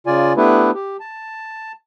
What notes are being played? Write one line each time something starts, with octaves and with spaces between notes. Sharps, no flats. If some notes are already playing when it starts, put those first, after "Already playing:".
C#3 F4 D5 G#5
A3 B3 D4 E4 G4 B4
G4
A5